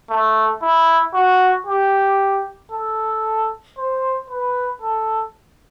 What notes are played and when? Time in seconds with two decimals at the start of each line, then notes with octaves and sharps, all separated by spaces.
0.10 A3
0.62 E4
1.14 F#4
1.67 G4
2.72 A4
3.78 C5
4.30 B4
4.82 A4